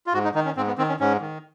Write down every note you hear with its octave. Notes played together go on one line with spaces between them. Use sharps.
F4
G#2 F#4
D#4
D#3 D#4
C#4
G#2 C4
B3
D#3 C4
C#4
G#2 C#4
D#3